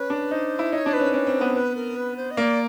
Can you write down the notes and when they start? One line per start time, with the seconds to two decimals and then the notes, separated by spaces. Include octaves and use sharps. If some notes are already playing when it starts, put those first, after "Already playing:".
Already playing: C#4 B4
0.10 D4
0.31 D#4 C5
0.59 E4
0.72 D#4 C#5
0.86 D4
0.93 C4 B4
1.00 C#4
1.14 C#4
1.27 C4
1.41 B3
1.55 B4
1.75 A#4
1.96 B4
2.16 C5
2.31 D#5
2.37 A#3 D5